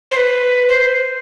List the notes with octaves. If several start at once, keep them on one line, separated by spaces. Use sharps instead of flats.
C5
B4
C5